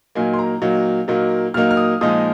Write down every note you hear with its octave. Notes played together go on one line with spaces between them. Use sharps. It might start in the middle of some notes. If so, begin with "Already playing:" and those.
A#2 F#3 A#3 D#4 G#5
C6
A#5
A#2 F#3 A#3 D#4
A#2 F#3 A#3 D#4
A#2 F#3 A#3 D#4 F6
F6
D#6
A#2 F3 G#3 D#4 D#6